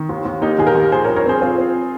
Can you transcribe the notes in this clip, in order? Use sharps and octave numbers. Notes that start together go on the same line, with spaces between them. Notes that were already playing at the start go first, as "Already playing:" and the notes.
Already playing: D#3
D#2
D#2
A#3 D#4 G4
D#2 G#4
G4 A#4
D#2
F3 G#4 C5
A#4 C#5
G2
A#4 C#5
C4 G#4 C5
C4 F4 G#4
C4